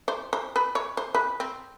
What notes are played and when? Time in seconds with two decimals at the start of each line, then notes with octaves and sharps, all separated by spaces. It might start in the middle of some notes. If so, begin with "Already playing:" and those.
0.08 C5
0.33 C5
0.56 B4
0.75 C#5
0.97 C5
1.15 B4
1.40 C4